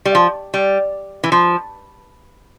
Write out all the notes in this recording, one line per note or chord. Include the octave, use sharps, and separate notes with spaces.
G3
F3
G3
E3
F3